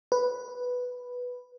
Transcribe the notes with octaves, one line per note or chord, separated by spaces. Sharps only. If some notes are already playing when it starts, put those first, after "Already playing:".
B4